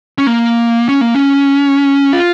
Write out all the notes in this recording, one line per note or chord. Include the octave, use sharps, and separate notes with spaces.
C#4
A#3
C#4
A#3
C#4
F4